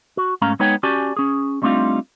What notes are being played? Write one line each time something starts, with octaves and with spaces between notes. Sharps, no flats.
F#4
G#2 A3 C#4 F5 A#5
G#3 B3 D#4 C#5 G5
C#4 F#4 G4 D5 G#5 A5
C#4 G#4
G3 A3 C4 D4 D#4 F4